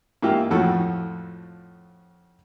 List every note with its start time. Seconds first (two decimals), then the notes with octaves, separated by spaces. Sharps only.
0.22 G#2 A#3 E4 F4 G4
0.51 F2 A2 F3 F#4 A4